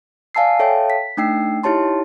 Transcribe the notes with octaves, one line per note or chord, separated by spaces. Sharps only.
D5 F5 G#5 A5 E6 C7
A4 C#5 E5 F5 G5 A5
B6
A3 D4 D#4 G5 E6 C7
D#4 E4 G4 C#5 A5 C6